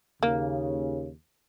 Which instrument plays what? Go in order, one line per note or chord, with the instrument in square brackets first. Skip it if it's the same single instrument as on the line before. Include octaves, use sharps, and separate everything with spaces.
[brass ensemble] D#2 C#3 [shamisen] A#3